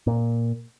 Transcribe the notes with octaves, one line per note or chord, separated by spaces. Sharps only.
A#2